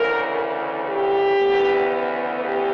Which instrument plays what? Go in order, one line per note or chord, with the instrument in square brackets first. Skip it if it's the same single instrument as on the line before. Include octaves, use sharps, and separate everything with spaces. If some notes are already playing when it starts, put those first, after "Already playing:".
Already playing: [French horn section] D2 C#3 E3 A#4
G4
D2 C#3 E3 B3
G4